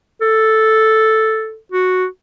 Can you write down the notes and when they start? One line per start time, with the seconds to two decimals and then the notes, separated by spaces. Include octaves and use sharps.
0.21 A4
1.72 F#4